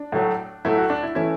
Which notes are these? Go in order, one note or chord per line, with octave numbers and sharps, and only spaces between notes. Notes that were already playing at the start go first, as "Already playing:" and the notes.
Already playing: D4
A2 F#3 A3
A2 F#3 A3 E4
F#4
D4
E4
E3 A3 C#4 E4